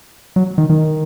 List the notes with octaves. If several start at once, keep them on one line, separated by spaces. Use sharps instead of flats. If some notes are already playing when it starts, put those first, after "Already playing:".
F#3
D#3
D#3